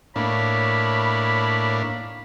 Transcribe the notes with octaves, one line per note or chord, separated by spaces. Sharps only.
A2 A#3 D4 C#5 B5